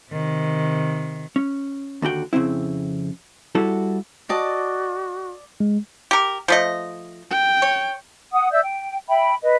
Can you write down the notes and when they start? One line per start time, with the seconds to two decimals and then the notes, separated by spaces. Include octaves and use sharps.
0.12 C3 D#3
1.36 C#4
2.02 D#2 D3 F#4 G5
2.33 F2 C#3 G3 C4 E4
3.55 G3 E4 F#4 A4
4.29 F#4 D5 D#5 A5
5.60 G#3
6.11 G4 A#4
6.48 F3 A3 D#5
7.31 G5
7.62 C#5
8.33 F#5 D#6
8.51 D5 E5 E6 G6
8.64 G5
9.09 E5 G5 B5
9.43 B4 D#5